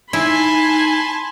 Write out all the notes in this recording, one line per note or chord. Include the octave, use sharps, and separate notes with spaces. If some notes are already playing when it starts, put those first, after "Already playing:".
D#4 E4 G#5 A5 B5 C6